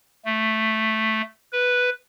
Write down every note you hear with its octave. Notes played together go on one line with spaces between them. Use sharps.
A3
B4